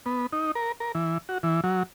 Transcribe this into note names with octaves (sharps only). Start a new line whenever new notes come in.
B3
D#4
A#4
A#4
E3
F#4
E3
F#3